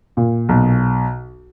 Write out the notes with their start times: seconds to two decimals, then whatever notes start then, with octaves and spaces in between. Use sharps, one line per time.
0.17 A#2
0.49 B1